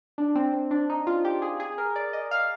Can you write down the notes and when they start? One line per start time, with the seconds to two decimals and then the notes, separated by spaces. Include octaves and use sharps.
0.18 D4
0.35 C4
0.54 C4
0.71 D4
0.90 D#4
1.07 F4
1.25 G4
1.42 G#4
1.60 G#4
1.78 A#4
1.96 D5
2.13 D#5
2.31 F5